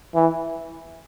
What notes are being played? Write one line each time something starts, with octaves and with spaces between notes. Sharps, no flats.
E3